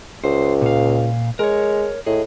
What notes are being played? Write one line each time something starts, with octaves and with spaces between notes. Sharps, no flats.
C#2 C5
A#2 F5
G#3 A#4 C#5
A2 G#4 D#5